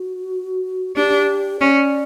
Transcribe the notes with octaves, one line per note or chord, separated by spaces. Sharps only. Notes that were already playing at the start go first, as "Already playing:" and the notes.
Already playing: F#4
D4 G4
C#4 D5